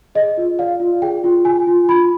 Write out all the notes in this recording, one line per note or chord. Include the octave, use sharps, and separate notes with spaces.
G#4 D#5
F4
D5 F5
F4
G#4 G5
F4
F4 G#5
F4
F4 B5